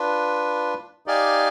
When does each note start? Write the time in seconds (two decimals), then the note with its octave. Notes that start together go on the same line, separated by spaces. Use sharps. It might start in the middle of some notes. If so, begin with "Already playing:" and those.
Already playing: D4 F4 B4
1.06 D#4 G4 D5 F5 G#5